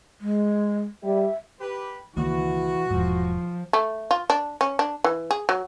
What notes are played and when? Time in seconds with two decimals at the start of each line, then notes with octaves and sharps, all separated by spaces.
0.21 G#3
1.03 G3 E5
1.61 G4 B4
2.17 C#2 D#3 E3 A#3 F#4
2.91 E1 G#2 F3
3.73 A3
4.11 F4
4.30 D4
4.61 C#4
4.79 D4
5.04 E3
5.31 G#4
5.49 F#3